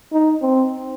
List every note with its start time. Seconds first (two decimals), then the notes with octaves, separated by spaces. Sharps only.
0.12 D#4
0.42 C4